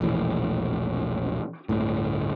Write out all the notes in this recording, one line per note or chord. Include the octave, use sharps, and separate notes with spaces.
E1 A#1 A2 E3
G1 D2 A2